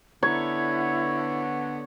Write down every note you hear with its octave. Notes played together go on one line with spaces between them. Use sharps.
D3 B3 E4 C#5